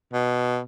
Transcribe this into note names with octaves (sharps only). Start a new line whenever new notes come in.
B2